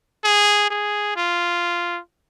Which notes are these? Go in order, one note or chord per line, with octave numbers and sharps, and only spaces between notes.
G#4
G#4
F4